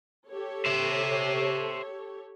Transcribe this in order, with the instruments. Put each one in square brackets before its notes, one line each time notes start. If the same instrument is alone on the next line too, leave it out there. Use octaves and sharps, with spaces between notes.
[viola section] G4 A4 C#5
[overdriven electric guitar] C5 E5